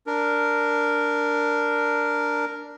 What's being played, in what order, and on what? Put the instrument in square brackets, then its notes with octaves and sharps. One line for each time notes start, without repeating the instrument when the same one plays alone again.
[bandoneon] D4 A#4